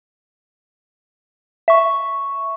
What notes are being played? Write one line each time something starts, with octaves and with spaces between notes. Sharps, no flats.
E5 C#6